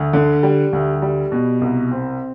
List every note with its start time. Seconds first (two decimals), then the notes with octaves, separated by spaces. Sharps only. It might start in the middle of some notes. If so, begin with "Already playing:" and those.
Already playing: D2
0.13 D3
0.43 G3
0.73 D2
1.02 G3
1.32 B2
1.61 C2
1.91 C4